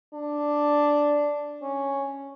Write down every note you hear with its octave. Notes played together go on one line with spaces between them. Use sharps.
D4
C#4